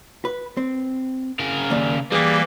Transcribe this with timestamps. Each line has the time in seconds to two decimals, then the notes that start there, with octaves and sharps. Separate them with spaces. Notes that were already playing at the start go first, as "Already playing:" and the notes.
0.25 B4
0.57 C4
1.40 C#3 A#4
1.70 D#2 A#3 D5
2.12 E3 G3 A#3 G#4